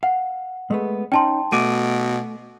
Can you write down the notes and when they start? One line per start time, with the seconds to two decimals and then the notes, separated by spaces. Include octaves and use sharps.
0.03 F5 F#5
0.70 G#3 A3 B3
1.12 C#4 D#4 G5 A5 C6
1.52 B2 A3 D6 D7 D#7